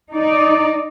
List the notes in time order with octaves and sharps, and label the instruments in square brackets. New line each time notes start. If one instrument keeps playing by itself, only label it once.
[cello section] D#4 D5